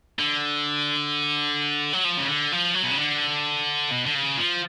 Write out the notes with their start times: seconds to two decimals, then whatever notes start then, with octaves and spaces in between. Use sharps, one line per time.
0.19 D3
1.93 F#3
2.05 F3
2.17 C#3
2.28 D3
2.52 F3
2.75 F#3
2.83 B2
2.91 C#3
2.98 D3
3.91 B2
4.06 D3
4.15 C#3
4.38 F3